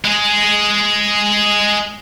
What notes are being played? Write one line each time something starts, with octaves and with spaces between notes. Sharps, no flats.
G#3 G#4